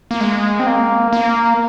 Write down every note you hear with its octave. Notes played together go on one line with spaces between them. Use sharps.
A#3
G#3
C4
A#3
A#3